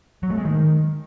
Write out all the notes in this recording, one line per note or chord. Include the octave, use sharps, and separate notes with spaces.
F#3
A3
G#3
D#3